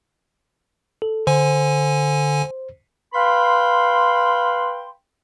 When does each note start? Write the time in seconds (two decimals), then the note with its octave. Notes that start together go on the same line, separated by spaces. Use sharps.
1.02 A4
1.27 D3 C5 G#5
3.14 B4 F5 G5 B5 C6